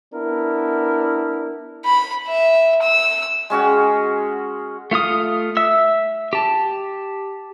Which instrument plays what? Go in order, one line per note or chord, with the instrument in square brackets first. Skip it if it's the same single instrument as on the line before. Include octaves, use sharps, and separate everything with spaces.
[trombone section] B3 D4 E4 A#4
[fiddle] B5
E5
E6
[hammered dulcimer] G#3 C#4 F#4 G#4
[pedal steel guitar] A3 F4 F5 D#6
E5 E6
G4 A5